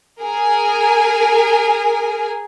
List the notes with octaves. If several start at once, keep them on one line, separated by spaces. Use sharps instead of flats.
G#4 A#4 G#5